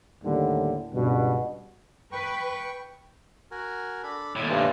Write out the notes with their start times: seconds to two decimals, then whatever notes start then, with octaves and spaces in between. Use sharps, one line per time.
0.24 D#2 A2 D3 G3
0.93 C#2 G2 B2
2.12 B4 G5 C#6
3.51 F#4 A#4 G#5
4.03 D4 A4 B5
4.36 D#2 A2 G#3 C#5 B5
4.50 G2 C#4 C5 E5